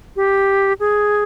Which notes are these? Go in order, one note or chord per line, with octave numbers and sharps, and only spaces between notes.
G4
G#4